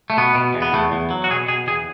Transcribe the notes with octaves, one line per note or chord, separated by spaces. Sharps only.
A3
B2 B3
B2
E2
B3
E2 A3
E2
F#3
F#4
B2 G#4
B2 G#4
E2 G#4